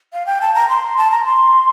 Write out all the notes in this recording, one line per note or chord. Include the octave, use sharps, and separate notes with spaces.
F5
G5
A5
A#5
C6
A5
A#5
C6